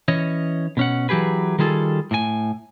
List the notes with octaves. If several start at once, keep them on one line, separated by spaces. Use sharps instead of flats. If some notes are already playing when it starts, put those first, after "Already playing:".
E3 C#4 C#5 D#5
B2 C#4 F#5
E3 F#3 G4 G#4 B4
D#3 G3 F4 G#4 A4
A2 G#5